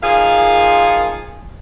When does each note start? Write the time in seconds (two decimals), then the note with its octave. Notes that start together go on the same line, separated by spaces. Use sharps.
0.03 A#2 D#3 F3 G#4 F5